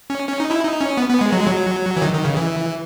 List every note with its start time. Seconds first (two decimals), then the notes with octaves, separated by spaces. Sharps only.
0.10 C#4
0.28 C#4
0.40 D#4
0.51 E4
0.63 D#4
0.81 C#4
0.97 B3
1.09 B3
1.21 G#3
1.32 F#3
1.40 G#3
1.47 F#3
1.97 E3
2.02 D#3
2.14 D#3
2.25 C#3
2.37 E3